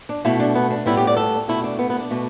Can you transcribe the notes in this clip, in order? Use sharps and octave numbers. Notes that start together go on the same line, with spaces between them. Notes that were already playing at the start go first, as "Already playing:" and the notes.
D4
B2 A3 E4
D4
B3
D4
A2 G3 B3 E4
G4
D5
A4
B2 A3 E4
D4
B3
B3
D4
B2 A3